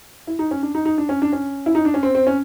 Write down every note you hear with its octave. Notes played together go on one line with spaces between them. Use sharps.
E4
D#4
C#4
D4
D#4
D#4
D4
C#4
D4
C#4
E4
D#4
D4
C#4
C4
C4
C#4